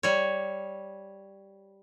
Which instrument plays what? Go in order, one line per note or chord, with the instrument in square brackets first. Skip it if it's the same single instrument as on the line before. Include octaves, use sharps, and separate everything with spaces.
[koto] G3 C#5